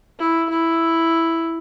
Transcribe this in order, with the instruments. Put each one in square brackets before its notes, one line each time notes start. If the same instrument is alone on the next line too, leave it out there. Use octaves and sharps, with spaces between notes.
[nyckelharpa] E4
E4